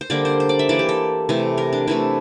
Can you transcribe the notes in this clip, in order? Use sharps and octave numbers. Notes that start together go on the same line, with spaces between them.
C5
D3 G3 A#3 D5
C5
C5
D5
E5
E3 A#3 D5
G4
A4
C3 E3 A3
A#4
D4
C3 E3 A3 E4